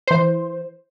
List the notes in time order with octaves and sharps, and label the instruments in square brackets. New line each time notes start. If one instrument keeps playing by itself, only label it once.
[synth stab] E3 C5